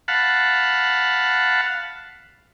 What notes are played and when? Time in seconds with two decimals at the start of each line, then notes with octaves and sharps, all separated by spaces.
0.08 F5 F#5 A5 B5